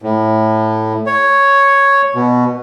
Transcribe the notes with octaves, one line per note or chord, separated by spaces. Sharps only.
A2
C#5
B2